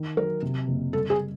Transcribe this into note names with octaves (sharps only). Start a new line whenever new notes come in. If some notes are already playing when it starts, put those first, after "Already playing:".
Already playing: D#3
F#3 A#4
C3
F#1
G3 A4
G#4